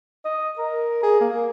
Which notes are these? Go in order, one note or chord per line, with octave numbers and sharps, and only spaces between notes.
D#5
A#4
G#4
A#3